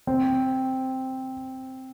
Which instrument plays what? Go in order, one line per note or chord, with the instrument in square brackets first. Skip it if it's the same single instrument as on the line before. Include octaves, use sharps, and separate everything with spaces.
[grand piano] C4